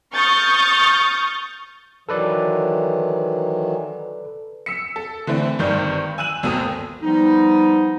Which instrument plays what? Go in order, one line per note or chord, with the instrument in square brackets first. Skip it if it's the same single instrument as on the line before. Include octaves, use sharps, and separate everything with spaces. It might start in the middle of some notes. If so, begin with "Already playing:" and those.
[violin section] C#6 D#6 F6 G6 A6
[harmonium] D#3 E3 F#3 [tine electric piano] A4 B4 D5
[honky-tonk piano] E6 B6 C#7
A4
D3 E3 A3 C4
G#1 G2 D#3 D5 C#6 G6
G#5 E6 F#6 D#7 F#7
G#1 D#2 B2 A4 D#6
[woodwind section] F3 G3 B3 D#4